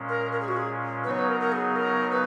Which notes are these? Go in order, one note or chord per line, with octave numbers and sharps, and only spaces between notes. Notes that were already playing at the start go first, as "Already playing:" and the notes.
Already playing: A#2 G#3 C#4
A#4
A#4
G#4
F#4
G#4
C#3 F#3 B3 D#4 B4
C#5
B4
A#4
A#4
G#4
A#4
B4